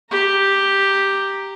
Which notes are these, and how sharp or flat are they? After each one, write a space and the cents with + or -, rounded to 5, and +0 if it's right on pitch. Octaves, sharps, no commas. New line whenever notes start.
G4 +0 A#5 +0